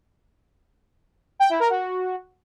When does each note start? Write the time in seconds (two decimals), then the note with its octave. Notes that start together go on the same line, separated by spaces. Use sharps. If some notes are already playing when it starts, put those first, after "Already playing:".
1.40 G5
1.50 E4
1.60 A#4
1.70 F#4